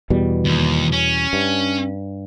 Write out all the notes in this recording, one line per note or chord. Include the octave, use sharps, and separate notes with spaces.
E2 B2 G3
D#2
C#4
G2